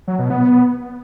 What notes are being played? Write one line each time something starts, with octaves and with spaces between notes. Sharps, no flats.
F#3
B2
B3